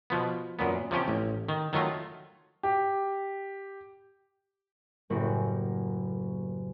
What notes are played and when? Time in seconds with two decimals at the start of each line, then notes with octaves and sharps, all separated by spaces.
0.10 B2 F3 B3
0.59 F#2 A#2 B3
0.91 C3 F3 C#4 G4
1.08 A1
1.48 D#3
1.73 D#3 F#3 A3 F4
2.63 G4
5.10 F#1 A2 A#3 F#4 G4